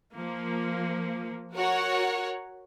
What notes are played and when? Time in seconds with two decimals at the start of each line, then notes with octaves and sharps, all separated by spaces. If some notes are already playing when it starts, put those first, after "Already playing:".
0.15 F3 A#3
1.54 F#4 A#4 C#5 F#5